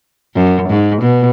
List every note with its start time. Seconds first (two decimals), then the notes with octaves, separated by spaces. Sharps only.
0.35 F#2
0.69 G#2
1.02 B2